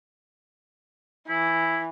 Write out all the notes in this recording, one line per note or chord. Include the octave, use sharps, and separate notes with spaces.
E3 E4